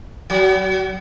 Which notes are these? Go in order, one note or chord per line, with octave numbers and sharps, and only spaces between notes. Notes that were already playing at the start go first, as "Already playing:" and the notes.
F#3